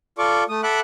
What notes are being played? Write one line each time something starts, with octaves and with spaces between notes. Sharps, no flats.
F4 A4 D5 C#6 D6
A3 D#6
A4 E5 F#5 B5 D6 F#6